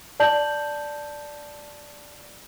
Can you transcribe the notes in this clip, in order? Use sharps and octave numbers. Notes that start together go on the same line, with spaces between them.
D5 A5 G6 F#7